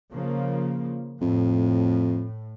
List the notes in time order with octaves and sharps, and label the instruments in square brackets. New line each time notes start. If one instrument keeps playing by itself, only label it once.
[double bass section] C#3 F3 A#3
[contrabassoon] F2 [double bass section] A2